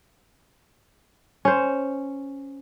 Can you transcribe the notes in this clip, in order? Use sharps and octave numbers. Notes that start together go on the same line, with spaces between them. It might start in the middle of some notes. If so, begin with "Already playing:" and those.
C#4 C5